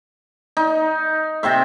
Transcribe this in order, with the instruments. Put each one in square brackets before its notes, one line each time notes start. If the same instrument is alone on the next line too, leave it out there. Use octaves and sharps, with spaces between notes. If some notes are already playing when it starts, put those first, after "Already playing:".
[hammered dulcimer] D#4
C3 C4 C5 E5